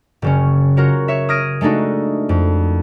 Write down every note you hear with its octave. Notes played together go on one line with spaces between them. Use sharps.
F#1 C#3 C#4
F4 F#4 A#4 C#5
C#5 E5
D#6 F6 G#6 A#6 D7 D#7
G#3 A3 D4 D#4 F#4
F2